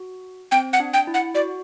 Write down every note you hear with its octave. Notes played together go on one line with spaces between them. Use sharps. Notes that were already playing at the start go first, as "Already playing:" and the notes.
Already playing: F#4
C4 G5
F#5
D4
G5
E4
F#5
F#4 D5